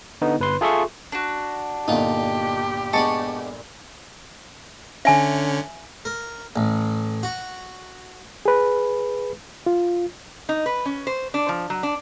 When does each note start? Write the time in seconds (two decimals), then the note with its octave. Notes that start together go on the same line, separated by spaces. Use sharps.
0.22 D3 B3 D#4
0.39 G1 B4 C6
0.61 F4 G#4 A4 E5 C6 C#6
1.12 D4 F#4
1.88 G1 A#2 D#4 F4 G4 F#5
2.93 G#3 B3 D4 A5 C#6
5.05 D3 C#4 E5 G#5
6.05 A#4
6.56 A1
7.23 F#4
8.45 G#4 B4
9.66 F4
10.49 D#4
10.66 B4
10.86 C#4
11.07 C5
11.34 D4
11.49 F3
11.70 F#3
11.83 D4